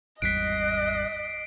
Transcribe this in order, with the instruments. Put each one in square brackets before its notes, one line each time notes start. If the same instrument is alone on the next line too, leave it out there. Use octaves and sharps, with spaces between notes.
[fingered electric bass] G#1 E2 G3 [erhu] D#5 [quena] F#6 [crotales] B6 C7 D7